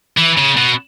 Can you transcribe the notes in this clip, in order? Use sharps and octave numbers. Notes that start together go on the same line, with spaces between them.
E3
C#3
B2